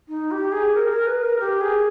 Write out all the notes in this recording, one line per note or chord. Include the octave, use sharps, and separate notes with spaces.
D#4
G4
G#4
A#4
A#4
B4
A#4
G4
G#4